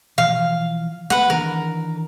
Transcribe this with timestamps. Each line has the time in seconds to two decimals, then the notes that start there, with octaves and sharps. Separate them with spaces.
0.18 B2 E3 F3 F5
1.10 G3 A#3 B3 B4 F#5
1.30 D#3 E3 D4 A#4